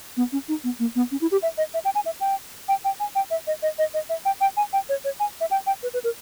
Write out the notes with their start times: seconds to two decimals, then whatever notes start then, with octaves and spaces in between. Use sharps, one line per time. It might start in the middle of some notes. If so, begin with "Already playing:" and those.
0.17 B3
0.32 C#4
0.48 D#4
0.64 B3
0.79 A#3
0.96 B3
1.12 C#4
1.21 E4
1.32 G4
1.42 E5
1.58 D#5
1.74 E5
1.85 G5
1.95 G#5
2.06 E5
2.21 G5
2.69 G5
2.85 G5
3.00 G#5
3.15 G5
3.31 E5
3.47 D#5
3.62 D#5
3.79 D#5
3.94 D#5
4.09 E5
4.25 G5
4.41 G5
4.57 G#5
4.73 G5
4.89 C#5
5.04 C#5
5.20 G#5
5.41 E5
5.51 G5
5.67 G5
5.83 B4
5.94 B4
6.04 A#4